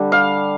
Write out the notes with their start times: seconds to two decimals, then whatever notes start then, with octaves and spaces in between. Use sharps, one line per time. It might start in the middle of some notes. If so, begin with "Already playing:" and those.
Already playing: D3 G3
0.12 F5